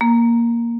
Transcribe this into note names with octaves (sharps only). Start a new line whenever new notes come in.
A#3